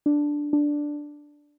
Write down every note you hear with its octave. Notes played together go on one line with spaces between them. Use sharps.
D4
D4